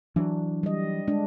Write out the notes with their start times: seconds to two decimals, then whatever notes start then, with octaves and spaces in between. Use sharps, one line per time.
0.16 E3 F#3 D4
0.63 G3 D#5
1.08 G#3 D4